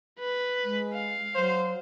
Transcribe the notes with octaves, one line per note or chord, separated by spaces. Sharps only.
B4
G#3
F5
F#3 C5